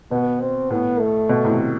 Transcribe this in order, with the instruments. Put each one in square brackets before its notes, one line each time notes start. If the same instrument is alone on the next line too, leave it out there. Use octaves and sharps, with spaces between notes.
[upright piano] B2 [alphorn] B3
[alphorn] C4
[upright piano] A2 [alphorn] B3
[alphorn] A3
[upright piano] B2
A2 C3